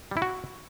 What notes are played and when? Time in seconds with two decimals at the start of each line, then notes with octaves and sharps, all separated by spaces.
0.11 G3
0.17 E4
0.22 F#4